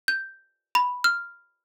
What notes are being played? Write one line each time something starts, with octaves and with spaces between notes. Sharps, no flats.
G6
B5
F6